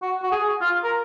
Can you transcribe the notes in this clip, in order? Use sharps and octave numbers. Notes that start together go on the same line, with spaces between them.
F#4
F#4
G#4
F4
A#4